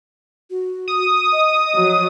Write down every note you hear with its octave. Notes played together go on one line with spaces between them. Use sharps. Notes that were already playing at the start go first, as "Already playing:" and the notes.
F#4
D#6
D#5
F3 F#3